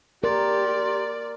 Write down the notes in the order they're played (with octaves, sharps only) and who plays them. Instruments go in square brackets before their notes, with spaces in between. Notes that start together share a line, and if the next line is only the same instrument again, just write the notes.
[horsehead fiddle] G4 [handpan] A#4 [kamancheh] D5 [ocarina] C6